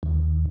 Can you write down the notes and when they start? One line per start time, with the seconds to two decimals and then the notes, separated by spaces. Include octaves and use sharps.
0.03 D#2